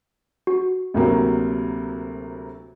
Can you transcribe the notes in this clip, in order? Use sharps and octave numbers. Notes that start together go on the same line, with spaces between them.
F#4
D2 C3 F#3 A#3